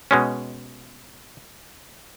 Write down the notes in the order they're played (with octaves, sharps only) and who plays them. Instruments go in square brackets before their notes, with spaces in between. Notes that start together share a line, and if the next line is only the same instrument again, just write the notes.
[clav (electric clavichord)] B2 G#3 C#4